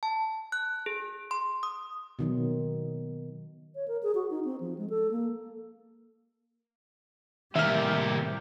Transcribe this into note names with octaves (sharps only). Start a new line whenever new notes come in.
A5
F#6
G#4
C6
D#6
B2 D#3 F#3
C#5
A#4
G#4
F#4
D#4
C4
F3
G#3
A4
A#3
A2 C3 D#3 G3 A#3 G4 E5 F6